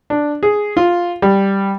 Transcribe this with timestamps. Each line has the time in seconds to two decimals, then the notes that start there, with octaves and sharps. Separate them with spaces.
0.10 D4
0.43 G#4
0.77 F4
1.22 G3